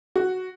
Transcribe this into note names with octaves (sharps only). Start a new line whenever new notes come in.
F#4